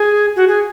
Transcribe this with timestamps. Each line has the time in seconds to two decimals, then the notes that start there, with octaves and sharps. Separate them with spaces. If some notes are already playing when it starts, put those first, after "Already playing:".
Already playing: G#4
0.36 F#4
0.48 G#4